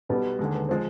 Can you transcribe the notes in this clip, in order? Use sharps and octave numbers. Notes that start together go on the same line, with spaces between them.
B1 B2 G3 B3
D#2 D3 G#3
B3
F3 G#3 C4